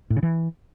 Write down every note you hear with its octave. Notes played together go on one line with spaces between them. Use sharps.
A2
C#3
E3